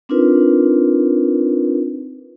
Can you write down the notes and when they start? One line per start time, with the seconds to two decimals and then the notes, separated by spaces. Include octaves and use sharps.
0.09 C4 D4 D#4 F4 A#4 B4